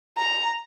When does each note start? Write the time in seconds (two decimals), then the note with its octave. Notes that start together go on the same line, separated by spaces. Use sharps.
0.17 A#5